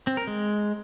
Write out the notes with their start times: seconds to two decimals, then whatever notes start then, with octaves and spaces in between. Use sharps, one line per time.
0.07 C4
0.17 A#4
0.27 G#3